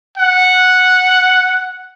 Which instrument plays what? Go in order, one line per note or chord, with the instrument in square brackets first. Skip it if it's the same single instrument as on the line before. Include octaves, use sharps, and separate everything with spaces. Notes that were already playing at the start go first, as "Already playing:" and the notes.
[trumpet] F#5